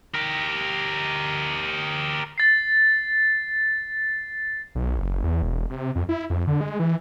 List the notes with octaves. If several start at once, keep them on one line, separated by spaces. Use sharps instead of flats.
G4 A#4
A6 C7
B1
F#1
E2
E1
C3
F2
E4
F2
D3
G#3
E3